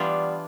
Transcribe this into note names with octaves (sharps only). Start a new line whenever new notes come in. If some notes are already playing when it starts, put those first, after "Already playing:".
Already playing: E3 G3 B3 D4 F4